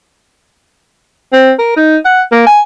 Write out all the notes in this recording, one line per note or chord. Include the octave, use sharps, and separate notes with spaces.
C4
A#4
D#4
F#5
A#3
G#5